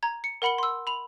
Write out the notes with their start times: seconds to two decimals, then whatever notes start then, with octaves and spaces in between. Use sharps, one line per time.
0.03 A#5 G#6
0.24 C#7
0.42 A#4 F#5 B5 C#7 G7
0.58 C6 E6
0.87 B5 F7